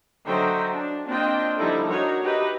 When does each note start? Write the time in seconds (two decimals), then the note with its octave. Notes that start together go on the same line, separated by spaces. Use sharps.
0.26 D3 F#3 D#4 C5 E5 G5
0.72 D4
1.06 A#3 C4 D4 F4 D#5 G5
1.57 D3 F3 G3 D#4 E4 A4
1.88 D4 D#4 F#4 A#4 C#5
2.23 D#4 G4 B4 D#5 E5